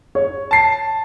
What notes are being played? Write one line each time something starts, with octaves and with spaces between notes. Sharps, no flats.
C#5
A5 C7